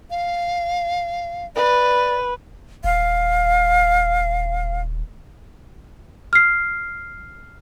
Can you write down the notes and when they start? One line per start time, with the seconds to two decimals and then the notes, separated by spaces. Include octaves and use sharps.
0.10 F5
1.56 B4 D5
2.84 D#1 F5
6.33 F6 C7